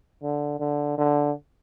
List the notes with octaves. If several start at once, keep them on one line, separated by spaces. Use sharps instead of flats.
D3
D3
D3